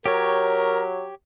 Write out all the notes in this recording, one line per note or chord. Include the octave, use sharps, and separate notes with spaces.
F#3 G4 A#4 C#5